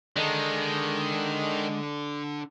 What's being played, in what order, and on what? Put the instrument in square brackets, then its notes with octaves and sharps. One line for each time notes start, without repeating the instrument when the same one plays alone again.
[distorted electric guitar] D#3 [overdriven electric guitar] G#3 [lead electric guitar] D4 A4